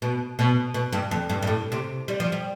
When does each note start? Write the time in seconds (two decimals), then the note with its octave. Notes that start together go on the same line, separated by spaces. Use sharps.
0.02 B2
0.39 B2
0.74 B2
0.92 G2
1.11 F2
1.29 G2
1.42 G2
1.47 A2
1.72 C3
2.08 G3
2.20 F3
2.32 G3